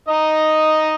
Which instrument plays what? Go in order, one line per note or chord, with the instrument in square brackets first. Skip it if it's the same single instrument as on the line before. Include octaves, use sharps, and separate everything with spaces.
[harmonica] D#4 D#5